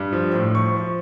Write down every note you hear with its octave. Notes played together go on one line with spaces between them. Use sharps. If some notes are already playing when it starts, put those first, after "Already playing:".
Already playing: G2
F3
A2
F3 C#6
F3